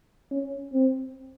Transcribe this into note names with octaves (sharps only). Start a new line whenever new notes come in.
C#4
C4